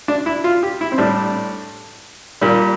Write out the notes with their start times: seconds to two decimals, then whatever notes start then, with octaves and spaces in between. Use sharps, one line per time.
0.08 D4
0.26 E4
0.44 F4
0.63 G4
0.81 E4
0.92 C4
0.98 A2 G3 D4
2.41 A#2 G3